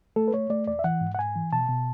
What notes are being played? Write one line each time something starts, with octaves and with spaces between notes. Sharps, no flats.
A3 A4
B4
A3 C#5
A3 D5
E2 D5
E5
E3 F#5
G#2
F#5
G#2 G#5
E3
B2 A5
B2